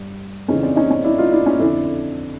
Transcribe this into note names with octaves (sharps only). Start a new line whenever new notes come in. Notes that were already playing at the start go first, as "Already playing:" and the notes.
Already playing: G2
F2 C#3 E3 C#4 D#4
C4 D4
C#4 D#4
C#4 D#4
D4 E4
D#4 F4
D4 E4
C#4 D#4
F2 D3 D4 E4